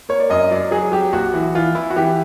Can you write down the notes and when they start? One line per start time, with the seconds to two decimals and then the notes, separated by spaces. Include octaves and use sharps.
0.09 A#3 C#5
0.20 D5
0.30 F#2 D#5
0.51 F#3 D5
0.71 F#3 G#4
0.92 F#3 G4
1.13 A#1 F#4
1.34 E3
1.55 E3 F4
1.75 E3 E4
1.90 F#4
1.96 E3 G4